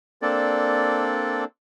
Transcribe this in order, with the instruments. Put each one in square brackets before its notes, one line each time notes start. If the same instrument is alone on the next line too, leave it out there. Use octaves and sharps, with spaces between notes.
[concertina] A#3 C4 D4 A4 D5